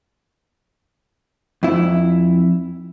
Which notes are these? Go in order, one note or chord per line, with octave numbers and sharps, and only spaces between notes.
F2 E4